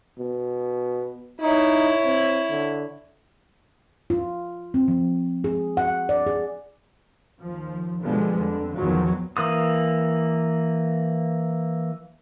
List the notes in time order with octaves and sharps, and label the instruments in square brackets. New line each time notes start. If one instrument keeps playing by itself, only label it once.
[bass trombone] B2
[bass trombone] D#4 [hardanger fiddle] E4 C#5
[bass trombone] C4
D3
[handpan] F4
C4
F3
G#4
F#5
D5
G#4
[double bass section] D#2 F3
B2 D3 F3 G3 G#3 B3
F2 D3
E2 A#2 D#3 F3 F#3
[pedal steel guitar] E3 A#3 D#6